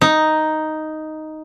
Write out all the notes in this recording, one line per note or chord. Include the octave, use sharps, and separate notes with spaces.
D#4